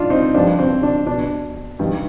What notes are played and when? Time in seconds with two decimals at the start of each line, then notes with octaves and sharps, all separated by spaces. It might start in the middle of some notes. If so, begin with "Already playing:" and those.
Already playing: D4 D#4 F4
0.10 C4 D#4
0.34 G2 F3 D4
0.59 C4
0.83 D4
1.07 B2 D4
1.79 G2 D#3